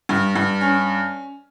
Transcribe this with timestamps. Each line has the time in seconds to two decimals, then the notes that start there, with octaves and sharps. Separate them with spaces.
0.09 G2
0.35 G2
0.61 C#4